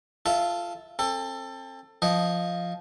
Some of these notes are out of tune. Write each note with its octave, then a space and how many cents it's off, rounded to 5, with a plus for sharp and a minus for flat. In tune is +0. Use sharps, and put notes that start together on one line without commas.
F4 -10 A4 +0 E5 -30
C4 +35 A4 +20
F3 +0 D#5 +0